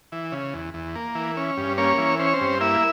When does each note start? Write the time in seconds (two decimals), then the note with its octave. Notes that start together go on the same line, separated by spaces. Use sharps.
0.12 E3
0.32 C#3
0.53 E2
0.74 E2
0.95 A#3
1.15 E3
1.37 C#4
1.57 G2
1.78 A#3 C#4 C#5
1.98 E3
2.19 C#4 C5
2.27 C#5
2.34 C4 C5
2.41 G2
2.60 A#3 E4 E5